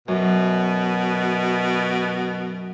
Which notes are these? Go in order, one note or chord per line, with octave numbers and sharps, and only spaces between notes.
F#2 B2